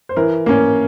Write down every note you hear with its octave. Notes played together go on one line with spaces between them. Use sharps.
C5
E3 A#4
A#3 C#4